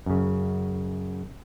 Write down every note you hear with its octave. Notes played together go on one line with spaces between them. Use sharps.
F#2 C#3